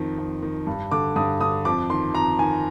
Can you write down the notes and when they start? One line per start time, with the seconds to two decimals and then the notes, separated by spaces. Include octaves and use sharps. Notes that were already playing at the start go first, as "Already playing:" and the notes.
Already playing: F2 D#3
0.18 F2
0.43 D#3
0.67 G2
0.91 D3 D6
1.16 G2 D#6
1.41 D3 D#6
1.65 F2 D6
1.90 D#3 C6
2.14 F2 A#5
2.39 D#3 G#5